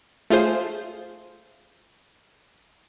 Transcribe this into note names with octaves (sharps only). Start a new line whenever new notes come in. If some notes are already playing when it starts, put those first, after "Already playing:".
A3 F4 G#4 C5